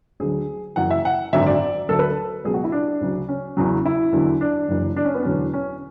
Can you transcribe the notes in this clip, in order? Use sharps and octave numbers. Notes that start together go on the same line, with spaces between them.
D2 D3 F#3 G#4
F#1 F#2 E3 F#5
E5
F#5
G#1 F#2 D3 F#3 E5
D5
D2 D3 F#3 A4
B4
A4
C#2 B2 F#3 G#4
F#4
E4
D4
D2 C#3 F#3
C#4
E2 C#3 F#3
E4
E2 D3 F#3
D4
F#1 F#2 E3
D4
C#4
B3
E1 E2 D3 F#3 C#4
C#4